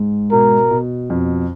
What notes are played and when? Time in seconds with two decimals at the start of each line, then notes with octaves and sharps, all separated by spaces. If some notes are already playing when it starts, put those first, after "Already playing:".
Already playing: G#2
0.32 B2 A#4
0.71 B2
1.10 F2